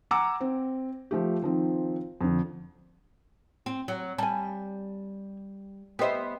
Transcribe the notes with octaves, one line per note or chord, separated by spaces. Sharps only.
F#5 G#5 A#5 D6 E6
C4
F3 A3 G4
D#3 F3 C4
F2 D3
C4
F#3
G3 G#5 A5
B3 G4 C5 D#5 E5